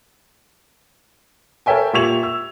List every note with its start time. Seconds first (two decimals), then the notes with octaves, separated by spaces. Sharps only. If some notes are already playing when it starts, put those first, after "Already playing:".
1.66 A4 A#4 C#5 E5 G5 G#5
1.93 A#2 G4 E5 C#6 G#6 F7
2.23 E6